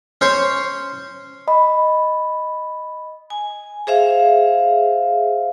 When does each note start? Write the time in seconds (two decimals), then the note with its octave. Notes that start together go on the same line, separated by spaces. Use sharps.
0.21 C#4 C5 C#5
1.48 D#5 B5
3.30 G#5
3.87 G#4 C5 E5 F5